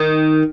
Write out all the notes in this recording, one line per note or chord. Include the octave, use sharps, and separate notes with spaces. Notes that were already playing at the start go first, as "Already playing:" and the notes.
Already playing: D#3